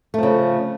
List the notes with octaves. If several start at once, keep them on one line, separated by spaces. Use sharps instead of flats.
C#3 F3 A3